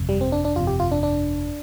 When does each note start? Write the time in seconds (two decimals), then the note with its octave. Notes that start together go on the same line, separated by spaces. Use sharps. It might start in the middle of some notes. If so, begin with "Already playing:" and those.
Already playing: G1 F2 C3
0.09 G3
0.21 C4
0.32 D4
0.45 D4
0.56 G1 F2 C3 F4
0.67 G4
0.80 F4
0.91 D4
1.03 D4